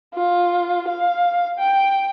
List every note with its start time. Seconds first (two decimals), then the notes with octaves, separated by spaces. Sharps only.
0.14 F4
0.89 F5
1.59 G5